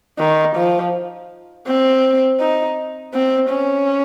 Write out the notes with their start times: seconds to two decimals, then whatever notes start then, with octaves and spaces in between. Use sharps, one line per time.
0.19 D#3
0.56 F3
1.67 C4
2.40 D#4
3.14 C4
3.50 C#4